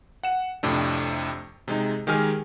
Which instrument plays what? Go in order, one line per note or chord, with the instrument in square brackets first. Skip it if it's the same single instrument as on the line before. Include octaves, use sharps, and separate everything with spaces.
[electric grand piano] F#5 E7
F2 A2 C3 D4
C3 G#3 D#4
D#3 G#3 G4 A#4 G#5 F6